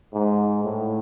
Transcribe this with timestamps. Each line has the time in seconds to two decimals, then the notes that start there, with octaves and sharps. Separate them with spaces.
0.14 G#2
0.64 A2